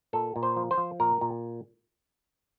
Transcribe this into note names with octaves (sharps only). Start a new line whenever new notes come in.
A#2 A4
A#2
C5
F3
C5
F3
A#2 A#4
A#2